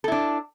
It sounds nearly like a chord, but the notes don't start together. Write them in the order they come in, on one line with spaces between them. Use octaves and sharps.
A4 E4 D4